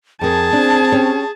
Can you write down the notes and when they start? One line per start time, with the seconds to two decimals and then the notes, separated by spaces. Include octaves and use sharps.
0.21 F2 G#4 A#4 A5
0.53 C4 D4
0.92 C#4 G4 C#5